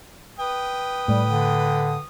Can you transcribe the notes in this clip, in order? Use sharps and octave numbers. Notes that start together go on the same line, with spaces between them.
B4 G5 D#6
A2 G3
D3